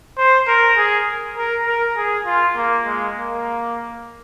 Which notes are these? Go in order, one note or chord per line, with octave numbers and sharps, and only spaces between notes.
C5
A#4
G#4
A#4
A#4
G#4
F4
A#3
G#3
A#3